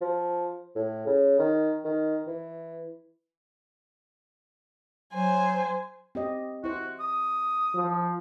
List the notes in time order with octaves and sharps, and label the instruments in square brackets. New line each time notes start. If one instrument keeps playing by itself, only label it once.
[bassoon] F3
A2
C#3
D#3
D#3
E3
[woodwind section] F#3 [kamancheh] C5 G#5
[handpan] C4 G4 D#5
[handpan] E4 C5 [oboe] F#4
[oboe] D#6
[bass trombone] F3